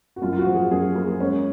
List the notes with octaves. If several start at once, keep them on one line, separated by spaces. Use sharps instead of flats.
F#4
F#2 F4
F4
F#4
F3
G#4
F#2 G#4
A#3 G#4
G#3 C#4